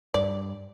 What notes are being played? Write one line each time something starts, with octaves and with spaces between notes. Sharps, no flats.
G2 D5